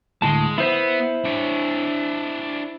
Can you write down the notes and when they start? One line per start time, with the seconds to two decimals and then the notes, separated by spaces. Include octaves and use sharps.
0.22 D2 A2 G#3 A5
0.58 B3 E4 C5 E5
1.25 D4 C#5